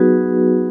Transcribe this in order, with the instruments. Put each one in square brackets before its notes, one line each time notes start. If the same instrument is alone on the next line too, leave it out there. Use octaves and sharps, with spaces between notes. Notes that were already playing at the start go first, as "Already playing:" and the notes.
Already playing: [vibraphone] F#3 B3 D#4 F#4 G#4 B4